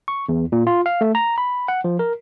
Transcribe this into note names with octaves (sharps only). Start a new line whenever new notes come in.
C#6
E2
A#2
F4
F5
A3
A#5
B5
F#5
F3
A#4